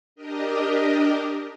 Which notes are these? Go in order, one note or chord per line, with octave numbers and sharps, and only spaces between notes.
D4 G4 A#4 D#5